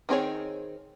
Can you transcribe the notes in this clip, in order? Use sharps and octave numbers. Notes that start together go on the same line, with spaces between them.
D#3 C4 G#4 C#5